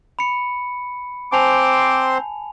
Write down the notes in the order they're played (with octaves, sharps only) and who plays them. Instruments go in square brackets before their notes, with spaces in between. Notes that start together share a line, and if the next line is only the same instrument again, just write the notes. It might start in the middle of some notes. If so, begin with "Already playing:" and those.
[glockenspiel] B5 C#7
[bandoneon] C4 C5 C6 [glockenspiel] G#5 A5 F7 [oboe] D6